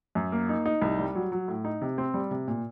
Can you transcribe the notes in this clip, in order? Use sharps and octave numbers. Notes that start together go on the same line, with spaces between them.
F#2
A#3
D#4
D#4
C2
G3
F#3
F#3
A2
D#4
C3
C4
G3
C3
A#2